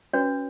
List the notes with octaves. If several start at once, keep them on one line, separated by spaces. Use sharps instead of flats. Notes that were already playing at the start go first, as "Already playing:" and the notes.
C#4 F#4 B4 C#5